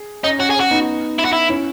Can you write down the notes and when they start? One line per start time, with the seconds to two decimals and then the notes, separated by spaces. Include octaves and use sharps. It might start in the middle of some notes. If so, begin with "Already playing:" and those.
Already playing: G#4
0.23 C#4 D#4
0.39 C#4 F#4
0.50 G#4
0.55 C#4
0.60 F#4
0.71 B3 D#4
1.19 E4
1.25 F#4
1.33 E4
1.49 C#4 E4